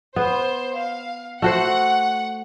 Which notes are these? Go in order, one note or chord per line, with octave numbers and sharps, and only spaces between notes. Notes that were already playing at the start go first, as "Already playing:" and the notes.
B3 C5
F5
A3 F#4 C5 F#5